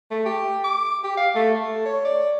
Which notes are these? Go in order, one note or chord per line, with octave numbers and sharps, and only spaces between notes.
A3
G4
D6
G4
F5
A3
A3
C#5
D5